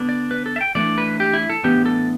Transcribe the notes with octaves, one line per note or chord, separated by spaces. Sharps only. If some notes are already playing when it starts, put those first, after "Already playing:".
Already playing: D3 B3 D4
D5
B4
A4
E5
G5
E3 A3 D4 D5
B4
G4
E4
A4
A2 E3 B3 D4 G4
A4